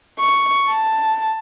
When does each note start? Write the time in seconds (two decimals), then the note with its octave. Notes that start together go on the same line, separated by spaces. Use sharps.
0.20 C#6
0.69 A5